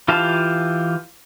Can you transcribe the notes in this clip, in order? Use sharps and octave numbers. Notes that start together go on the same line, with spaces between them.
E3 F4 G4 F5 A5